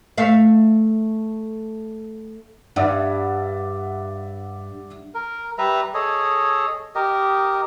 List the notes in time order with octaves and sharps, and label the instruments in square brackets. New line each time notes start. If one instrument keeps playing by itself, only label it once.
[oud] A3 E5 F5
[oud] G2 [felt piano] D5 E5 F#5
[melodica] A#4
G3 B4 E5 A#5
G#4 A4 C#5 D#5
G4 A#4 D#5